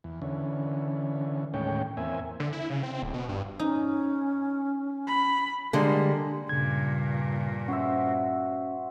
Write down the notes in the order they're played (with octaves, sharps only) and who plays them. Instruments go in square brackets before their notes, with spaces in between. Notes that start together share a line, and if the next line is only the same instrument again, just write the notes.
[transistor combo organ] E2
D3 E3 C#4
D#2 A2 G#3 C#4 C#5 G5
E2 A#3 C4 E5 G#5
[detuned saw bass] D3
E4
C#3
C4
D1
B2
G2
[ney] C#4 [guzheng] D#4
[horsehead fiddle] B5
[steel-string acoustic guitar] D3 G3 G#3 [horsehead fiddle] A#3
[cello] G2 A#2 [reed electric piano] C#3 G#6
[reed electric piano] C#4 [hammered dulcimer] F#4 C5 E5